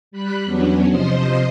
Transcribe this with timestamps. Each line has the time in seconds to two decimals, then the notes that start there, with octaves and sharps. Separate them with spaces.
0.11 G3 B5 F#6
0.45 E2 F#3 B3 C#4 D4
0.88 C3 F3 C5 D#5 C6 C7